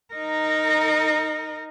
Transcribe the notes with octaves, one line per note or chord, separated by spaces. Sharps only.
D#4 A#4